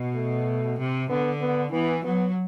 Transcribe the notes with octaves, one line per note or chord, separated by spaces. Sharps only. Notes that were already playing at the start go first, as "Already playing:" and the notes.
Already playing: B2
A3
C3
D3 B3
B3
E3 B3
F#3 B3